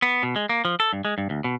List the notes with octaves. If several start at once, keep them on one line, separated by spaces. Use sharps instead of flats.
B3
B2
G#3
A#3
F3
A4
G2
G#3
G2
D2
B2